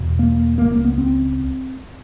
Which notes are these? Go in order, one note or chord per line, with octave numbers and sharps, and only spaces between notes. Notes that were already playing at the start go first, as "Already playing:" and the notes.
Already playing: E2 B2
A#3
C#2 C#3 A#3
A#3
B3
C4